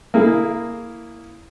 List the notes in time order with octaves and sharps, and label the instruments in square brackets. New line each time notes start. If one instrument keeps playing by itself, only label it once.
[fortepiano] A#3 E4 G#4